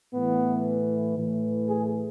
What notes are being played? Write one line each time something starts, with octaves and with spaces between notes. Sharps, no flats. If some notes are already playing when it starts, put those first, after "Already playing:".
A2 E3 B3
A2 E3
G#4